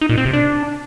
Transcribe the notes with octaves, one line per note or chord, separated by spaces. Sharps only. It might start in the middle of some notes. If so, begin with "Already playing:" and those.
D#4
A#2
C4
C3
D4